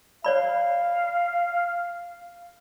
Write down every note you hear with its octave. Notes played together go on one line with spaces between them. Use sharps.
C#5 D5 F5 B5